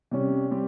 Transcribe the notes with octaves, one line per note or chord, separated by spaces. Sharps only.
C3 G3 C#4 G4
G3 C4 G4